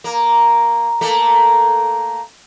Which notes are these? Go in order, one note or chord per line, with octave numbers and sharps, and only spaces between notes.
A#3
A3 A#3